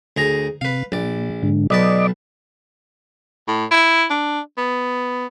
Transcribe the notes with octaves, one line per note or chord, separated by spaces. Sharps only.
D2 G#4 A#5
C3 B4 F5
A#1 A#2 D5
G#2 D3
B1 B4 D5 D#5 A5 D6
A2
E4
D4
B3